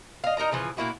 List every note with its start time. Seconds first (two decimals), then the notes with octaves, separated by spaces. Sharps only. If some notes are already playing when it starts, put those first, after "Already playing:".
0.24 D#5 F5
0.37 D#4 A#4 D#5 A#5
0.51 A#2 C#3 E3 F3
0.77 A#2 A#3 E4 F#4